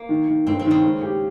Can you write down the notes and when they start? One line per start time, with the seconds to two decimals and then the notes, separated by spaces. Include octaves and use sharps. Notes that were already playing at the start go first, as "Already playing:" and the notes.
Already playing: A#3
0.09 D#3
0.29 D#3
0.46 G1 C4
0.59 C4
0.65 D#3
0.71 C#3
0.84 G#3
1.01 G4